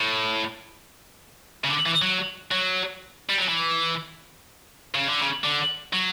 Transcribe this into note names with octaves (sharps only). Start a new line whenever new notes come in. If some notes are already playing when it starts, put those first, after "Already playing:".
Already playing: A2
C#3
D3
E3
F#3
F#3
G3
F#3
E3
C#3
D3
C#3
D3
F#3